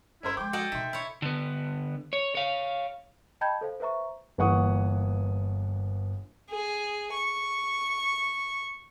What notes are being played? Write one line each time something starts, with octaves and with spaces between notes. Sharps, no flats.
G1 C#4 E4 A#4 C5
F3 G#3 G5 C6 D6
F#4 A4 D5 D#5
B2 E3 D#4 E5 C6
E4 C#5
D3 B3
C#5
C#5 F5
D#5 G5 A5 B5 G6 G#6
A4 C5 F5
B4 C5 E5 A#5 C#6
G1 E3 A#3 F#5 C#6 D#6
G#4
C#6